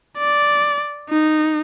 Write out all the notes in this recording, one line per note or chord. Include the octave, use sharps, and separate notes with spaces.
D5
D#4